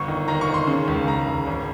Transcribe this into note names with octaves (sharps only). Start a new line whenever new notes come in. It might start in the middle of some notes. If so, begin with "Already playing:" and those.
Already playing: G1 C#6
D#3
D#3 A#5
C#6
D#3
C6
C#3
C#2
C#2 A#5
C#2
G#1